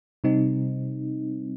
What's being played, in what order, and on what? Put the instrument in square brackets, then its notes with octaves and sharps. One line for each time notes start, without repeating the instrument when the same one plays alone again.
[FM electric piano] C3 G3 C4 D#4